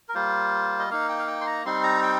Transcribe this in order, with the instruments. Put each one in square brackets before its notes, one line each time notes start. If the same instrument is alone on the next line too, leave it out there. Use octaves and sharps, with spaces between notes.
[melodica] A#4
G3 A#3 F4 C5
D#5
A#3 D#4 F5
G5
F5
G5
C6
A#5
G3 C4 D#4 C6
A#5
G5